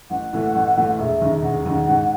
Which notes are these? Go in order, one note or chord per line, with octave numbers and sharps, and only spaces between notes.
A1 F#5
A2 E3 A3
A1
A2 E3 A3
E1 E5
D#2 C#3
E1 F#5
D#2 C#3
G#2